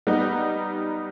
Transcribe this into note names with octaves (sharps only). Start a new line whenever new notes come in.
G3 B3 D#4